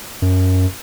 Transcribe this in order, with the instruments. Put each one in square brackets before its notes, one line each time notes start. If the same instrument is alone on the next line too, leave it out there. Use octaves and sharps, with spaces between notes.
[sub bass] F#2